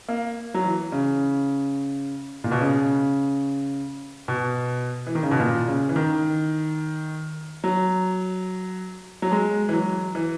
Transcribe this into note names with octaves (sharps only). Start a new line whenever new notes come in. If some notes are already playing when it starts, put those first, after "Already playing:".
A#3
F#3
E3
C#3
A#2
B2
C#3
B2
E3
D#3
C#3
B2
A#2
C#3
E3
D#3
F#3
F#3
G#3
E3
F#3
E3